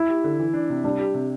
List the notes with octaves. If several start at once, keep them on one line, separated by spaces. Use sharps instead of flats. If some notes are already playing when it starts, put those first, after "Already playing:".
Already playing: E4
G4
D3
E3
D4
C3
G3 D4
G4
C3